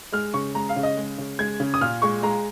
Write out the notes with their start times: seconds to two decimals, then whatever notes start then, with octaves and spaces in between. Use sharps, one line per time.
0.12 G#3 F6
0.34 C#3 C#6
0.54 G#3 A#5
0.69 F5
0.76 C#3
0.83 D#5
0.97 G#3
1.18 C#3
1.39 G#3 G#6
1.60 C#3
1.74 D#6
1.81 A#2 F6
2.02 G#3 C#6
2.23 G#3 A#5